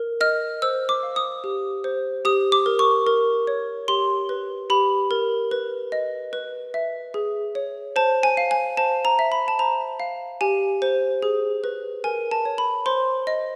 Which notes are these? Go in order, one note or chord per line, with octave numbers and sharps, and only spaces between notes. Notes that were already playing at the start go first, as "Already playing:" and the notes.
Already playing: A#4
D#5 F6
C5 E6
D6
F5
D#6
G4
C5
G4 D#6
D6
A#4
C#6
A#4
C#5
G4 C6
B4
G4 B5
A#4
B4
D#5
B4
E5
G#4
C#5
C5 A5
G#5
F5
G#5
C5 A5
A#5
E5
B5
A5
C5 A#5
F5
G4 G#5
C5
G#4
B4
A#4 G#5
A5
C#5
B5
C5 C6
D#5